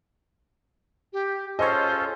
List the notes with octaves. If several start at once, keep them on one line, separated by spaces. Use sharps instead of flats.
G4
C#4 F4 G#4 A4 C5 C#5 D#5